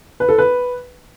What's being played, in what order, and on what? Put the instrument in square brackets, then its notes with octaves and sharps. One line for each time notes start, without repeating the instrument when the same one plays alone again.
[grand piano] B4
A4
B4